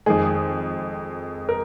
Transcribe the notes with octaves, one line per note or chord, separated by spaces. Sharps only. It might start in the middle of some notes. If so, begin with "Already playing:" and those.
F2 D#3 G#3 G#4
A#4